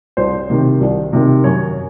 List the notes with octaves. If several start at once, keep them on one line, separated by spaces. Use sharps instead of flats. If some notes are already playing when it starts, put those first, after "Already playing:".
C2 C5
C3 D#3
C2
C3 D#3
F#2 C#5